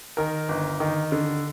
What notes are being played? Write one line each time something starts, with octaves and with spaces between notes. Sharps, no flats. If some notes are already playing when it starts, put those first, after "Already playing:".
D#3 A#4
G1
D#3
D3